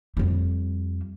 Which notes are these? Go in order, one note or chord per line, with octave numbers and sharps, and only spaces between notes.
F2 G3